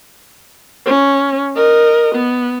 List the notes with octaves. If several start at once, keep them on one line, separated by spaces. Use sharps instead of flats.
C#4
A#4 D#5
B3